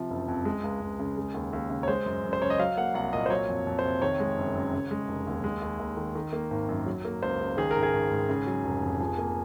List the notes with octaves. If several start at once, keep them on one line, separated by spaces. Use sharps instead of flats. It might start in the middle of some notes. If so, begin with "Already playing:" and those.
Already playing: C3 F3
F#1
F2
G#3
C#2
C#2
C#3
G#3
D#2
D#2
C#3
C#5
G#3 C5
F#2
F#2
C5
C#3 C#5
D#5
F#3 F5
A#3 F#5
C2 F#5
A#2 D#5
C5
F#3 C#5
F2
F2
C5
C3
D#3 C#5
G#3
F#1
F#2
C#3
G#3
F1
D#2
G#3
D#2
D#2
D#3
D#3
A#3
G#1
F#2
F#3
A#3
C#2 C5
C#3
D#3 G#4
A#4
G#1
G#4
G#1
G#2
C#3
F#3
F1
F2
F3
A#3